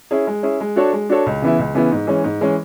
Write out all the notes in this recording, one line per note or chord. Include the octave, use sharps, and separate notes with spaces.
C#4 E4 G#4
G#3
C#4 E4 G#4
G#3
D4 F#4 A4 C#5
G#3
D4 F#4 A4 C#5
C#2
C#3 E3 B3 E4
C#2
C#3 E3 B3 E4
G#2
E3 G#3 C#4
G#2
E3 G#3 C#4